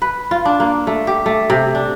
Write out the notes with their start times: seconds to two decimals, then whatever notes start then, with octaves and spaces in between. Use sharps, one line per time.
0.02 B4
0.31 F4
0.45 D4
0.60 A#3
0.87 A3
1.07 G4
1.26 A3
1.50 C3
1.75 D4